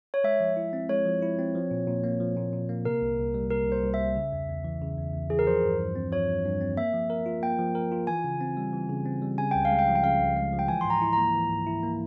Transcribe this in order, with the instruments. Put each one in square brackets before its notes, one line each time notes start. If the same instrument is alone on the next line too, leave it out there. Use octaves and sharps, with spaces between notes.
[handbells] C#5
[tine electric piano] G#3 [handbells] E5
[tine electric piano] F3
E4
C4
[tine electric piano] G#3 [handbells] C#5
[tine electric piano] F3
E4
C4
F3
A#2
A#2
A#3
F3
A#2
A#2
A#3
[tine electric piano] C3 [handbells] A#4
[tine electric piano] C2
C2
G3
[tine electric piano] C3 [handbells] A#4
[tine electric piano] C2 [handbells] C5
[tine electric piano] C2
[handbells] E5
[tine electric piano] G3
C#3
E2
E2
E3
C#3
E2
E2
[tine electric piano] E3 [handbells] G#4
[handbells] A#4
[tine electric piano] F3 [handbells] C5
[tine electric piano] G2
G2
C4
[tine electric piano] F3 [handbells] C#5
[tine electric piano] G2
G2
C4
[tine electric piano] A#3 [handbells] E5
[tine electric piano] F3
A#4
F4
[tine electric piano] A#3 [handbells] G5
[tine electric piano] F3
A#4
F4
[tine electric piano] E3 [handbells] G#5
[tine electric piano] C#3
C4
G3
E3
C#3
C4
G3
[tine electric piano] C#3 [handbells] G#5
[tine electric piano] C#2 [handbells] G5
[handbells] F5
[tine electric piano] G#3
[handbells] G5
[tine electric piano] F3
[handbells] G5
[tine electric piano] C#3 [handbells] F5
[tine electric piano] C#2
G#3
F3
[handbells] G5
[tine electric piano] E3 [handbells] G#5
[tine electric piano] G#2 [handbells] C6
[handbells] A#5
[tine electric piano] E4
[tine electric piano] A#3 [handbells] A#5
[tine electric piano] E3
G#2
E4
A#3